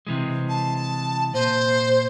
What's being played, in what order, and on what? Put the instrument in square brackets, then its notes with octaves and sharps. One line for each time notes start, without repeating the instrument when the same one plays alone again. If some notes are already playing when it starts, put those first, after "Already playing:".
[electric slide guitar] C3 E3 G#3
[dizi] A5
[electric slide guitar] A#2 [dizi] C5